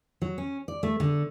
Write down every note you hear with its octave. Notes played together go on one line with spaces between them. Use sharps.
F#3
C#4
D5
A3
D3